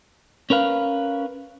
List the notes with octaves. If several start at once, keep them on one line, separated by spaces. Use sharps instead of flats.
C#4 A#4 B4 F5